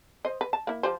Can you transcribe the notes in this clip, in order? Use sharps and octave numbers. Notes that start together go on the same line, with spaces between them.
C5 D#5
B4
A5
A#3 E4
F3 G4 C5